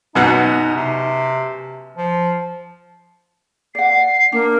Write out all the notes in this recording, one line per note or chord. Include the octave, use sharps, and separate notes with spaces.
F#2 B2 D#4 F#5
C3
F3
D5 F#5 C7
A#3 D4